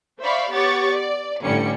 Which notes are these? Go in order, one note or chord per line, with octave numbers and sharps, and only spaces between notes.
C5 D5 E5 F5 B5 C#6
B3 G4 C#5 C#6 D6 A6
D5
G1 A2 D3 G3 C#4 C#7